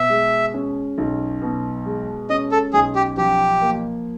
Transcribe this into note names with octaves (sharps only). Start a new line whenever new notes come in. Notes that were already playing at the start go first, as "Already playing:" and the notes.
Already playing: B2 E5
G#3
C#4
B1
B2
G#3
C#4 D#5
A4
B1 G#4
G4
F3 G4
A#3